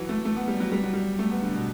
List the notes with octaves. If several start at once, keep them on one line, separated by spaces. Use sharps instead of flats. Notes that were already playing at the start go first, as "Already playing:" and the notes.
Already playing: E3 F#3
A3
A3
B3
G3
F#3
G3
F#3
G3
A3
B3
D3
B2